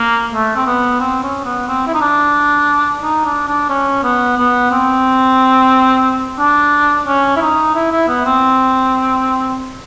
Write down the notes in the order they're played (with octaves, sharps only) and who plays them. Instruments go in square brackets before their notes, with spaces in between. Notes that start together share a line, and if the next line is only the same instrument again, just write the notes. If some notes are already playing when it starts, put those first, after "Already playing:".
Already playing: [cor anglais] A#3
A3
C4
B3
C4
C#4
B3
C4
E4
D#4
D4
D#4
D4
D4
C#4
B3
B3
C4
D4
C#4
E4
D#4
E4
E4
B3
C4